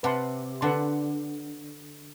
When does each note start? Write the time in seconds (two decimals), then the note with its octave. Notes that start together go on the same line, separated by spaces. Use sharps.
0.03 C3 B4 F#5 A5 C6
0.61 D3 B4 F#5 A5 C6